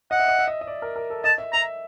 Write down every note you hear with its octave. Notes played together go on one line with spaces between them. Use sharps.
D#5 F#5
E5
D#5
E5
D#5
D#5
D5
A#4
A#4
A4
D#5 A5
E5
E5 A#5